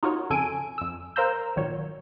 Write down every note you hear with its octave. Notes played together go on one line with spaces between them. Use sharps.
D#4 F4 F#4 A#4 C#5
F2 C#3 A4 G#5 D7 D#7
F2 E6
A#4 C5 F5 A#5 E6 G6
G#1 A#2 D#3 F#3 C#5